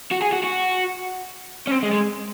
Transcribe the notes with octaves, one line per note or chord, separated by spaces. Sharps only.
F#4
G#4
F#4
F#4
C#4
C4
G#3
G#3